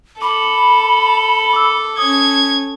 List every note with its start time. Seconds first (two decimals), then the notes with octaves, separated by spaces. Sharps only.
0.22 A4 B5 D6
1.53 D6 E6
1.98 C#4 D#6 G#6